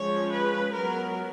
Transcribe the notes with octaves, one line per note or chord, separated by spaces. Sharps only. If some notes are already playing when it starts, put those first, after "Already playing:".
Already playing: F3 G#3 C#4 C#5
B4
F#3 B3 A#4